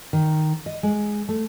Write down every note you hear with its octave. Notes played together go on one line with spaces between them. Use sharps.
D#3
D#5
G#3
A3